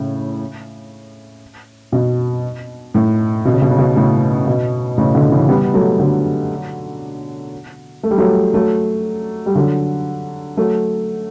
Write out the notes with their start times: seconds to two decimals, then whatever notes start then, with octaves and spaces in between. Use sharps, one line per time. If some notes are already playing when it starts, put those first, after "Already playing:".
Already playing: A2 C#3
1.92 B2
2.94 A2
3.45 B2
3.53 C#3
3.62 B2
3.70 C#3
3.78 B2
3.96 A2 C#3
4.47 B2
4.98 A2 C#3
5.15 B2 D3
5.31 C#3 E3
5.49 G3 B3
5.74 F#3 A3
6.00 D3 F#3
8.03 A3
8.11 G3
8.18 F#3 A3
8.54 F#3 A3
9.46 G3
9.55 D3 F#3
10.57 F#3 A3